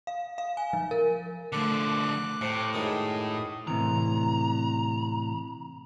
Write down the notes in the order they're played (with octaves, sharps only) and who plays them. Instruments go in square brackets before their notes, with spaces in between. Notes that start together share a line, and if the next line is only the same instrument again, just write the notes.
[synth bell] F5
F5
G#5
F3
A#4
[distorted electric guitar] D3 F3 [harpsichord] A3 [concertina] D6 F#6
[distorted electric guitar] A2 [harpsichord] C3
[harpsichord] F#2 D#3 G#3 [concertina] D#6
[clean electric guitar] A2 C3 E3 [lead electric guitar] A#5